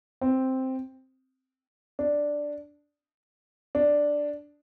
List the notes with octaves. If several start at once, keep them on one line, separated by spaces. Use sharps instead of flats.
C4
D4
D4